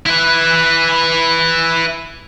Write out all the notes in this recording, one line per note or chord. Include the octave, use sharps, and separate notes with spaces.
E4 B4